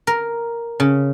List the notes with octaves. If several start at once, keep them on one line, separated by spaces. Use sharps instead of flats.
A#4
C#3